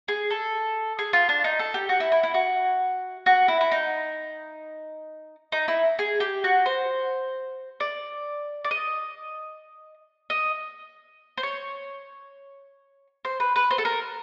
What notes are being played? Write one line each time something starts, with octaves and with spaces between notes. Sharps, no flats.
G#4
A4
G#4
F4
D4
D#4
A4
G4
F#4
E4
E4
E4
F#4
F#4
E4
E4
D#4
D#4
E4
G#4
G4
F#4
C5
D5
D5
D#5
D#5
C5
C#5
C5
B4
B4
C5
A4
A#4